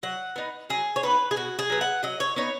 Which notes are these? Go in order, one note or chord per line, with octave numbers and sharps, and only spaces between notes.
F#3 F#5
B3 D#4
F#3 G#4
C#5
B3 D#4 B4
G#4
B2 F#4
G#4
F#3 B3
F#5
F#3 D#5
C#5
B3 D#4 C#5